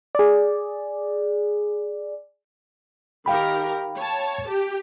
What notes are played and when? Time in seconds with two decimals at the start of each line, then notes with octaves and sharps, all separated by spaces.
0.15 G#4 D5
3.26 D#3 G4 A#4 F5 G5 B5
3.97 C#5 A5
4.49 G4